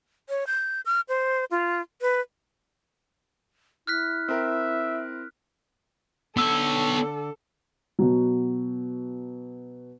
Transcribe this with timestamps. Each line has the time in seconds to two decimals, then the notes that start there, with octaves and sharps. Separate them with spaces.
0.29 C#5
0.47 G6
0.86 F6
1.08 C5
1.51 F4
2.01 B4
3.87 E4 F6 F#6 B6
4.28 C4 A#4 E5
6.37 D3 B3 A4 C#5 E6
7.99 B2 F#3